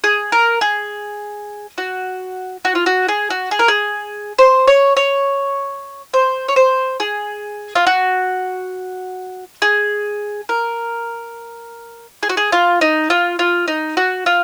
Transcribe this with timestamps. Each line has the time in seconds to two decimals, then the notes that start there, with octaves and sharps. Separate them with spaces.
0.04 G#4
0.32 A#4
0.61 G#4
1.78 F#4
2.65 F#4
2.75 F4
2.86 F#4
3.08 G#4
3.30 F#4
3.51 G#4
3.59 A#4
3.68 G#4
4.39 C5
4.67 C#5
4.97 C#5
6.14 C5
6.48 C#5
6.56 C5
7.00 G#4
7.75 F4
7.87 F#4
9.62 G#4
10.49 A#4
12.23 G#4
12.29 F#4
12.37 G#4
12.52 F4
12.81 D#4
13.10 F4
13.39 F4
13.68 D#4
13.97 F#4
14.26 F4